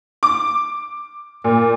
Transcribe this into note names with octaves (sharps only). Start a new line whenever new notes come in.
D6
A#2